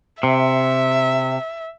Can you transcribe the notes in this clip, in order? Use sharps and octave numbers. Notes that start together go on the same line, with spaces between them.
C3 E5